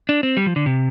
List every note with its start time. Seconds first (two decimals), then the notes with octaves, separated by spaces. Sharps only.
0.09 D4
0.23 C4
0.37 G3
0.46 F3
0.56 D3
0.66 C3